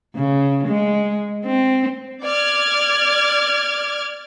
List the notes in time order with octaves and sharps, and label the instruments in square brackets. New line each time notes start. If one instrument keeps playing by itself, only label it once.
[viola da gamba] C#3
G#3
C4
[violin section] D5 F6 G#6